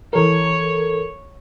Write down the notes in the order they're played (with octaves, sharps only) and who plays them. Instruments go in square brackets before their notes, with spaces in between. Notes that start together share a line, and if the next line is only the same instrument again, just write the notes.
[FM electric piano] E3 A4 A#4 [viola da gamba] C#5